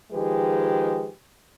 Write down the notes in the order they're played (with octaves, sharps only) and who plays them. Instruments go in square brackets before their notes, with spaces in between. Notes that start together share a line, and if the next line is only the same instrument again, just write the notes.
[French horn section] D#3 F3 G#3 G4 G#4 B4